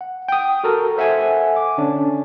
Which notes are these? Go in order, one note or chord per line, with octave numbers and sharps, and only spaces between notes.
F#5
G5 D#6
F#4 A4 A#4
A4 C5 E5 F#5 G#5
D6
D3 C#4 D4